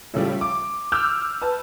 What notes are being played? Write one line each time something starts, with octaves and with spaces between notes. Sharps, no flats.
A2 C#3 F3 G3
D6
D6 E6 F6 G6
B4 A5